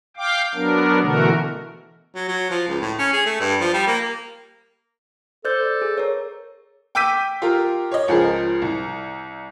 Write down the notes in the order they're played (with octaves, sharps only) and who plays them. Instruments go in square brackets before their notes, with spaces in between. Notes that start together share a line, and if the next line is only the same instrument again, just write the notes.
[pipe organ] F5 G5 D6
F#3 B3 D4 A#4
B2 D3 E3 A3 F#4 A#4
[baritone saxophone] F#3
F#3
F3
C#2
A2
C#4
G#4
A3
G2
F3
G3
A#3
[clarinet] A4 [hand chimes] C5 D5 G6
[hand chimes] G#4
A#4 C#5
[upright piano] G5 D6 E6 G6 B6 D#7
F4 G4 A#4
C#5 D#5
C#2 F3 G#4 A#4
C2